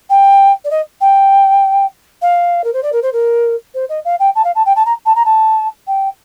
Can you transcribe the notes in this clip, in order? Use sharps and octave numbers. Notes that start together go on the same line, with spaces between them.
G5
D5
D#5
G5
F5
A#4
C5
D5
A#4
C5
A#4
C5
D#5
F5
G5
A5
F5
A5
G5
A5
A#5
A5
A#5
A5
G5